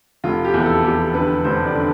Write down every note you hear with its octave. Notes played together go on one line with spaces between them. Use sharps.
F1 F4
G4
E2
A4
E2 G4
D3 B4
F1 C5
D5
D3